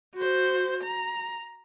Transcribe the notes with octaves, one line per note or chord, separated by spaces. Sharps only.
F#4 C5
A#5